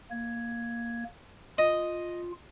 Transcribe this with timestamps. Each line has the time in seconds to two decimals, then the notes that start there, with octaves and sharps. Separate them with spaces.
0.11 A#3 G#6
1.58 F4 D#5